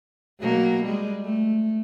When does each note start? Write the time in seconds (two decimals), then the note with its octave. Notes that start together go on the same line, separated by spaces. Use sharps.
0.41 B2 F#3 A#3
0.84 G3 G#3
1.25 A3